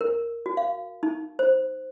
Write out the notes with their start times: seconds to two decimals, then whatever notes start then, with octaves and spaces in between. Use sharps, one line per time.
0.01 A#4
0.46 F#4
0.57 F5
1.03 D#4
1.39 C5